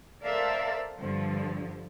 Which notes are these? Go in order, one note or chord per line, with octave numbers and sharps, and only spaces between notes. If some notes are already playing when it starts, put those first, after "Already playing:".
A4 A#4 C5 D5 E5 F5
G2 D3 F3